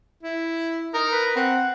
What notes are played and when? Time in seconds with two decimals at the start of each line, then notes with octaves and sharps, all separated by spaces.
0.23 E4
0.94 D#4 A#4
1.12 B4
1.36 C4 F#5